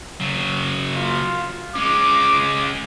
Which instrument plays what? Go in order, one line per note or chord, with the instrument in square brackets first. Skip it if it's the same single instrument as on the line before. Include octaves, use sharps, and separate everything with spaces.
[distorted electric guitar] C#3 F#3
[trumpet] F4
[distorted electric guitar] G#3 C#4 [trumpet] D6